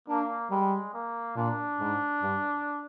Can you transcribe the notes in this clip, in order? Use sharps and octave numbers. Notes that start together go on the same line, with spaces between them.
A#3 D4
G3 G#3
A#3
A#2 D4
G#2
G2